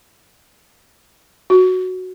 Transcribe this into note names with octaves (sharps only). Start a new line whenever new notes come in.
F#4